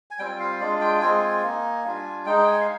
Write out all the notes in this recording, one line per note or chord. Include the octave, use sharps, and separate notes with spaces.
G#5
G3 C4 F4 G5
F5
G#3 D4 F4 D5
G5
G#3 C4 F4 G#5
G#5
A#3 D#4
G3 D4 F4
G#3 D#4 G5
G#5
F5